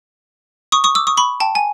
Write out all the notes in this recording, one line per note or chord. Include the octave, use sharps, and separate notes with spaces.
C#6 D#6
C#6 D#6
D6 E6
C#6 D#6
B5 C#6
G5 A5
G#5